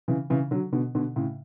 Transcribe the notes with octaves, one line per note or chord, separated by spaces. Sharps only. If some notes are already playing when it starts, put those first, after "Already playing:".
C#3 E3
C#3 E3
D3 F#3
B2 D3
B2 D3
A2 C#3